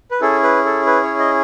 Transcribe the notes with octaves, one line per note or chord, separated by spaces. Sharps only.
B4
C#4 E4 G#4 A4
B4
A4
B4
C#5
D#5